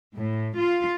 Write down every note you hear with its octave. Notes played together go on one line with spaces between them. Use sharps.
A2
F4